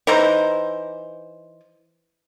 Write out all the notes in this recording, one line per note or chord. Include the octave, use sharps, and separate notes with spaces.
E3 D#4 C5